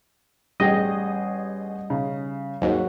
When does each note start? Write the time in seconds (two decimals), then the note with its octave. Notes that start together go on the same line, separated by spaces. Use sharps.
0.60 A1 G3 G#4 D#5 G5
1.90 C#3
2.62 D#2 G#2 F#3 F#4